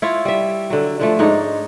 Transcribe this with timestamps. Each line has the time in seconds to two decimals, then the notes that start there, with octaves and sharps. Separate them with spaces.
0.02 E4 F4 C#5
0.25 G3 E5
0.70 D3 F#3
1.00 D3 F3 A3
1.19 G#2 D4 D#4 C#5